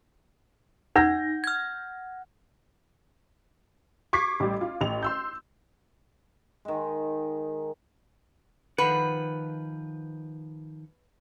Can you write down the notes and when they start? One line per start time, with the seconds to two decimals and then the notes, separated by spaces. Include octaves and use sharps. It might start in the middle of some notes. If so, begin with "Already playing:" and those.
0.96 D#4 F#5 G6 A#6
1.44 F6 G#6
4.13 C#6 D6 G#6 B6 C7
4.40 A1 G3
4.61 F4
4.81 A1 F7
5.03 C6 E6 G6
6.65 D#3 G#3
8.78 D#3 F3 B4 F#5